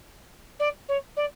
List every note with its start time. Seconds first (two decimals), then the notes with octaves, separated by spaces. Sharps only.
0.59 D5
0.88 C#5
1.16 D5